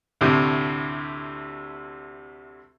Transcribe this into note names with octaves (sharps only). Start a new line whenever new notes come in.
D2 A2 C3